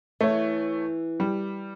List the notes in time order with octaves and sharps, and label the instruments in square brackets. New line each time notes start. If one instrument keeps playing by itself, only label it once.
[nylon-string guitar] E3 [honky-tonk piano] A3 C#5
[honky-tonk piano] G3